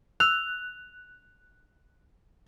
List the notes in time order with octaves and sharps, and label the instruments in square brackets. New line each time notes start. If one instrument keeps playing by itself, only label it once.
[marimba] E6 [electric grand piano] F#6 [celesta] F7